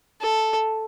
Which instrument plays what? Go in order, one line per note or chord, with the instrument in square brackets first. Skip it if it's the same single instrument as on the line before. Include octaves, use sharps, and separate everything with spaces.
[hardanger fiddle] A4